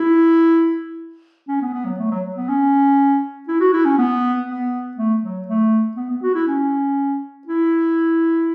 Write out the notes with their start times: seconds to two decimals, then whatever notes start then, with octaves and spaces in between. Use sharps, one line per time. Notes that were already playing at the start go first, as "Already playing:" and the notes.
Already playing: E4
1.48 C#4
1.62 B3
1.74 B3
1.86 F#3
1.98 A3
2.11 F#3
2.36 B3
2.49 C#4
3.48 E4
3.60 F#4
3.73 E4
3.85 C#4
3.98 B3
4.48 B3
4.97 A3
5.22 F#3
5.48 A3
5.97 B3
6.10 B3
6.22 F#4
6.34 E4
6.48 C#4
7.47 E4